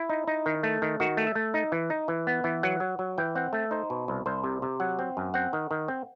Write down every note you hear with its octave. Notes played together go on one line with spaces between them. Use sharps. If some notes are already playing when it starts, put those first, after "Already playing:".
Already playing: E4
D#4
D#4
D#3
A3
D#3
D#3 F#4
A3
E5
A3
D#4
E3
D#4
E3
B3
E3
F#3 F#5
F#3
F#3
E3 G5
C4 F#5
A3 E5
D#4 C5
B2
C2
C2 C5
C3
C3
F#3 F#5
C4
F#2
C4 F#5
D#3
D#3
C4